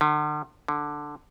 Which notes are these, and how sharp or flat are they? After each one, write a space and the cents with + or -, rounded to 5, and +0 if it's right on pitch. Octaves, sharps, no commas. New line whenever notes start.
D3 +40
D3 +5